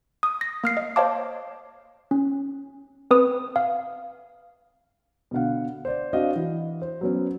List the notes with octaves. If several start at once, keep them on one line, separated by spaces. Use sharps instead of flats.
D#6
A#6
A#3 F6 C7
D#5
C5 C#5 D#5 F5 A5 D6
C#4
C4 B4 D#6
F5
B2 D3 F5 F#5
C5 D5
C4 D4 F#4 D#5 F5 F#5
E3
C5
F#3 B3 C#4